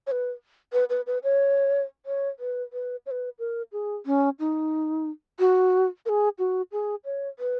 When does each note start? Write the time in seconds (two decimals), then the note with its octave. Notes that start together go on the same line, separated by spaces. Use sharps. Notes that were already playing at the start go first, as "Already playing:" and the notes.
0.07 C#5
0.11 B4
0.73 B4
0.90 B4
1.07 B4
1.23 C#5
2.06 C#5
2.39 B4
2.73 B4
3.06 C#5
3.11 B4
3.39 A#4
3.72 G#4
4.06 C#4
4.39 D#4
5.39 F#4
6.06 A#4
6.09 G#4
6.39 F#4
6.72 G#4
7.05 C#5
7.39 B4